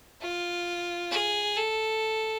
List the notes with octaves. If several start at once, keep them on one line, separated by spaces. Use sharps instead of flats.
F4
G#4
A4